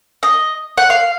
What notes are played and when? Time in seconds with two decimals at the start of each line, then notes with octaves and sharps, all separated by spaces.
0.23 D#5
0.78 F#5
0.90 F5